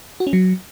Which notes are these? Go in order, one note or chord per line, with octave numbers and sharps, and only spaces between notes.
F#4
C#4
F#3